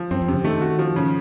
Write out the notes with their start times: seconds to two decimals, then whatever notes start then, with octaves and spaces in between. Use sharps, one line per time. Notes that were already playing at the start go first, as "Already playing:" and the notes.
Already playing: F3
0.11 F#2 C4
0.22 F2
0.28 C3
0.34 C#3
0.44 D#3 A3
0.61 F#4
0.79 F3
0.96 C#3